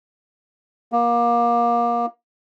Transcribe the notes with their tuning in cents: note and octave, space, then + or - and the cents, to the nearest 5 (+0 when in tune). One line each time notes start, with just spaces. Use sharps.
A#3 +25